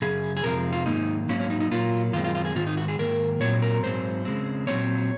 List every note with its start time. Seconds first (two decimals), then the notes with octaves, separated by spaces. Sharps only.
0.02 F#2 C#3 G#4
0.37 G#4
0.44 F2 C3 F3 G#3 C4 A#4
0.72 F4
0.86 G#2 D#3 A#3 D#4
1.29 G#2 F#3 A#3 C#4
1.40 C#4
1.50 D#4
1.60 D#4
1.71 A#2 F#3 A#3 F4
2.13 F#2 D#3 G#3 C4 F4
2.24 F4
2.35 F4
2.45 G#4
2.55 G#2 D#3 G#3 F4
2.67 D#4
2.77 F#4
2.88 G#4
2.99 G#2 D#3 A#3 A#4
3.40 A#2 F#3 C4 C#5
3.62 A#4
3.83 G#2 F#3 C4 C5
4.25 C#3 G#3 C4
4.67 A#2 F#3 C4 C#5